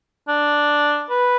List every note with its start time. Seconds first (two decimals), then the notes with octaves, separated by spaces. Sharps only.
0.28 D4
1.10 B4